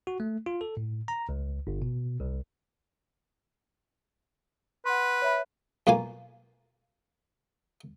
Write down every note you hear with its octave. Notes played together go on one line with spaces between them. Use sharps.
F#4
A3
F4
A4
A2
A#5
C#2
G1
B2
C2
B4 F#5 C6
C#5 E5 B5
B1 A#3 F4 G#5